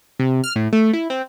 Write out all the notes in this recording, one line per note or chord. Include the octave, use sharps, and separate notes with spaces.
C3
F6
A2
A3
E4
C4